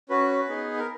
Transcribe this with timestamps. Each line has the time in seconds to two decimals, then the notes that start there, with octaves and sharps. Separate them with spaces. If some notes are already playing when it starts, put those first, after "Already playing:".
0.09 C#4 F#4 B4
0.49 B3 D#4 G#4
0.79 A#4